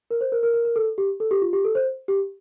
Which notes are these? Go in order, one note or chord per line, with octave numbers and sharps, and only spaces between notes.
A#4
C5
A#4
A#4
A#4
A#4
A4
G4
A4
G4
F4
G4
A4
C5
G4